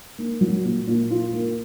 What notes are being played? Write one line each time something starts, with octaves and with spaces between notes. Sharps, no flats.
A#3
F#3
A#2
A#2
F4
A#3